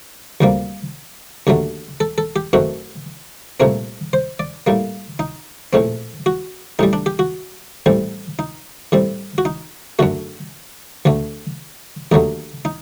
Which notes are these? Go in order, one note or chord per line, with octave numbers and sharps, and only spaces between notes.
D2 C3 G3 A#3
D#2 D3 F#3 A3
A4
A4
G4
F#2 D#3 A3 C4 F#4
C2 A#2 A3 C4 A#4
C5
D5
A2 G3 A#3
D#4
A#1 A2 A3 C4
F#4
A1 A2 G3 D#4
D4
G4
F#4
A1 A2 G3 C4
D#4
A2 G3 C4
F#4
D#4
F#2 D3 A3 F#4
D2 D3 A3
D#2 D3 F#3 A3 D#4
D#4